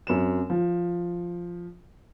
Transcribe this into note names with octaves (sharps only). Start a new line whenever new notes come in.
F#2 C4 E7
F3